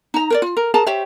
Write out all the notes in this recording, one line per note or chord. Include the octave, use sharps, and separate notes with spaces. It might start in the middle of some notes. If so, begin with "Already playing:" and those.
D#4 A#5
A#4 C5 D5
F4
A#4
G#4 A#4 A5 A#5
G4 C5 C#5 E5